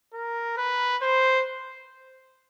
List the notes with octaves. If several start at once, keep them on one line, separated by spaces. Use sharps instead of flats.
A#4
B4
C5